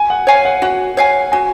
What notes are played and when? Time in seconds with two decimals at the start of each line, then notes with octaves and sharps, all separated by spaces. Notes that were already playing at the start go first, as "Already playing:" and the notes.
Already playing: G#5
0.10 F#5
0.27 C#5 F5 G#5
0.45 F#5
0.62 F#4 F#5
0.97 C#5 F5 G#5
1.32 F#4 G#5